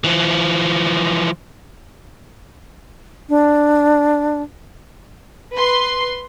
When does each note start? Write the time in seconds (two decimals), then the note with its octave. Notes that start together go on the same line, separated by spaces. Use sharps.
0.04 E3 F3
3.29 D4
5.55 B4 C6